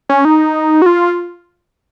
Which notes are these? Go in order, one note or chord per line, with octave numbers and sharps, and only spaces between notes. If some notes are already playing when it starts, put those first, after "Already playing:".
C#4
D#4
F#4
F4